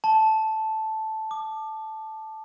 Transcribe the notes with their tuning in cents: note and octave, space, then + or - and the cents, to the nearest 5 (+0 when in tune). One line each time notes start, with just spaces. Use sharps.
A5 -5
D6 +30